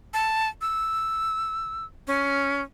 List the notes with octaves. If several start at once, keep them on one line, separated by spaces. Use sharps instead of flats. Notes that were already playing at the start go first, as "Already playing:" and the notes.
A5
E6
C#4